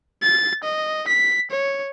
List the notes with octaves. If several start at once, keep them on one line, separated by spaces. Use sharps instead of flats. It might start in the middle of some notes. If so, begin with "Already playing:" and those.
A6
D#5
B6
C#5